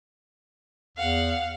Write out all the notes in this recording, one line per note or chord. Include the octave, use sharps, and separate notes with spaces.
E2 F5 F#5